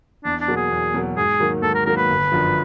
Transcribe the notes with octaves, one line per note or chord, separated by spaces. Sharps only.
E2 D4
D4
B2 F#3 A#3
G#4
E2
B2 F#3 A#3
G#2 G#4
D#3 F#3 A#3
G#2 A4
A#4
D#3 F#3 A#3 A#4
B4
G1
F#2 D3 F3